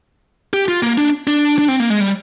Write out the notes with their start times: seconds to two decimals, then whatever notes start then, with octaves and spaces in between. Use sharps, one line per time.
0.53 G4
0.68 F4
0.83 A#3
0.98 D4
1.27 D4
1.58 D4
1.68 C4
1.80 A#3
1.90 G#3
2.00 G3